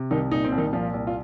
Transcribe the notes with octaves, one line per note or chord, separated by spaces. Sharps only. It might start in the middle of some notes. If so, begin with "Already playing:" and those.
Already playing: C3
C2 D#3 D#4
A#2 D#4
C4
C2
D#3 D#4
A#2 F3 F4
C2
F4